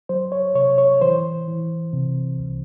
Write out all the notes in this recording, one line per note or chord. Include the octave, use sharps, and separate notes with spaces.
F#3 C5
C#5
C3 C#5
C#5
E3 C5
E3
C3
C2